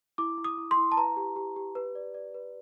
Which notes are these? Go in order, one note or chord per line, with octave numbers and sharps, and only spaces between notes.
E4 D6
E4
D#6
E4
C6
E4
A5
B4 A#5
G4
G4
G4
B4
D5
D5
B4